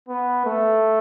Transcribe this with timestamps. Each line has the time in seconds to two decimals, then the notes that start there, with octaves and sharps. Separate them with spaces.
0.09 B3
0.46 A3